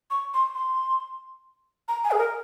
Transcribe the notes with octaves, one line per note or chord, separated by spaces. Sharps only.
C#6
C6
C6
A#5
G#5
G#4
A#4